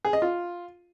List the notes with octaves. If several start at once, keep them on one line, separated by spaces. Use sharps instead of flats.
G#4
D#5
F4